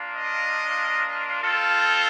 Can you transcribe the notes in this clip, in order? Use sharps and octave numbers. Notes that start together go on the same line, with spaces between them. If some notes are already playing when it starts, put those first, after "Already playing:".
Already playing: A#3 D4 F4
D#5
C4 F4 A4